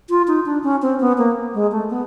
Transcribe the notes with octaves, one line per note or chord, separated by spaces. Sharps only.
F4
D#4
D4
C#4
C4
B3
A#3
G#3
A3
B3